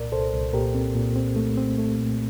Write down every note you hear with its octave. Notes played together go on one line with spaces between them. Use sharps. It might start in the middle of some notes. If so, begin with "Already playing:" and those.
Already playing: C2 A#2 A#4 D5
C2 A4 C5
C2
A#2 G4 A#4
C4
A#2
C4
A3
C4
A3
A#2